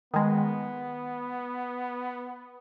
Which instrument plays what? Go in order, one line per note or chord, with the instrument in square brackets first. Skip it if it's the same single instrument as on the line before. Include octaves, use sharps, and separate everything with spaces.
[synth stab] D#3 G#3 [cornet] B3